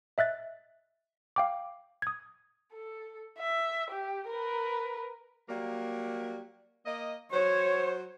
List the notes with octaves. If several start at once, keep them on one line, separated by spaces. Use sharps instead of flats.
D#5 E5 F#6 A6
F5 G5 D6
D#6 G#6
A4
E5
G4
A#4 B4
F#3 G3 A#3
A#3 D#5
F#3 C5 C#5